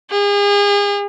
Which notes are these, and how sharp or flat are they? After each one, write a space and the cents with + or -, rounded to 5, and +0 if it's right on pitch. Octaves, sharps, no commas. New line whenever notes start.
G#4 -40